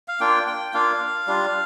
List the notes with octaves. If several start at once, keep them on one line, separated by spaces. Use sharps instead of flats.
F5
A#3 D4 F4 G5
G5
A#3 D4 F4 F5
G3 D4 F4